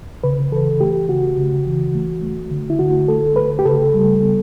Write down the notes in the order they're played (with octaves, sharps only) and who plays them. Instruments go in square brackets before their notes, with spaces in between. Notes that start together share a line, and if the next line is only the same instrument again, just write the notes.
[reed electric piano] C#3 B4
E3 A4
A3 G4
C#3 F#4
C#3
E3
A3
A3
D3
E4
D3 F#4
A3 A4
A3 B4
G4
C#3 A4
G3
B3